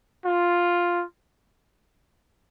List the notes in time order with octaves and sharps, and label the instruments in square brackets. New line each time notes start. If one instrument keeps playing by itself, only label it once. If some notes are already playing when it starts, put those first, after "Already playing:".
[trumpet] F4